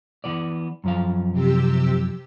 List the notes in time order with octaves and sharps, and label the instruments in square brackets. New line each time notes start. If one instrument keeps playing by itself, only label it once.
[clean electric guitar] E3 B3 D5
F#2 F3 F5
[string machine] C3 G4 E6